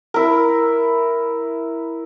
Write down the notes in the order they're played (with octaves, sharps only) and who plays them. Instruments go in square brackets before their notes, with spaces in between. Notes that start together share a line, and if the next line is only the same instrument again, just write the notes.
[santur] E4 A#4